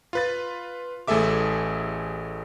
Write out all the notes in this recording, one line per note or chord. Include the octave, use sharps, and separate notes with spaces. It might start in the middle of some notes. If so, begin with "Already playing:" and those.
F4 B4 A6
A1 A3 G#4 A4 E5 D6